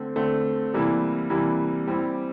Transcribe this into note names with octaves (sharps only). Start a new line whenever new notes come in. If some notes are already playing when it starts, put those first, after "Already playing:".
Already playing: D3 A3 C4
D3 A3 C4
C3 E3 G3 A#3 E4
C3 E3 G3 A#3 E4
G3 C4 E4 G4